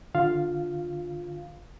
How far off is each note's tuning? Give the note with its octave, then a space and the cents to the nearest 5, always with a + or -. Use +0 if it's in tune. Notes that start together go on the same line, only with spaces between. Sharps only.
D3 +5 F4 +10 F5 +0